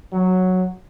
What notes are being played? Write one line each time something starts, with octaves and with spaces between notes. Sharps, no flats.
F#3